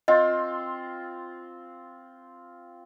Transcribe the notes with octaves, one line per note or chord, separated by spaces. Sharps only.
C4 F4 D#5 C6